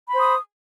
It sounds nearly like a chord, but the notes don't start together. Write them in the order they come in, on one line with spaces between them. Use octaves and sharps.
B5 C5 D#6